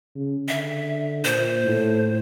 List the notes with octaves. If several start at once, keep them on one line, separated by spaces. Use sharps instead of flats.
C#3
D3 E5
A#2 C5
A2